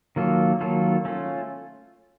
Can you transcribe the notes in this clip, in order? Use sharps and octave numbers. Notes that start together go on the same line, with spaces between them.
D#3 F#3 A#3 F4 A4
D#3 F#3 A#3 F4 A4
A3 C#4 F4